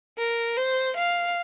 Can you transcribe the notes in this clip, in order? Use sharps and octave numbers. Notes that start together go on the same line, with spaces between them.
A#4
C5
F5